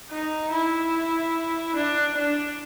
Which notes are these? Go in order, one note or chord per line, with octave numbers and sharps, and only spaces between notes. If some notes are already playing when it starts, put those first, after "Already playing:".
D#4
E4
D4
D4